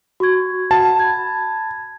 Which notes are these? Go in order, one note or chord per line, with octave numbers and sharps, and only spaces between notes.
F#4 C#6 G#6
F#4 F#5 A5
B5 G#6